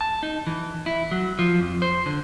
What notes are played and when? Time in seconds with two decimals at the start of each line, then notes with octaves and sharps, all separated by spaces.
0.01 A5
0.23 D#4
0.47 E3
0.86 E4
1.11 F#3
1.39 F3
1.60 F2
1.82 C5
2.06 D3